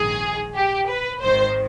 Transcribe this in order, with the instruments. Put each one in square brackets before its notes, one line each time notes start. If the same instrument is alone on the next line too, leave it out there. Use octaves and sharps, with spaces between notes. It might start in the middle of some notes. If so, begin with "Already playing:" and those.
Already playing: [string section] A#1 G#2 D#3 G#4
G4
B4
G#1 G#2 D#3 C5